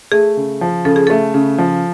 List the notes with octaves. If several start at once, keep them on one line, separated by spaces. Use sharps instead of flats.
A3 G#4
C#3
F3
C#3 A4
G#4
A3 A4
C#3
F3